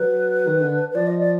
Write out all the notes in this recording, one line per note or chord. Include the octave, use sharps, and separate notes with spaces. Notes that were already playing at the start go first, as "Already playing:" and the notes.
Already playing: F#3 B4
D#3
D3
B4
F3 D5
D#5
D5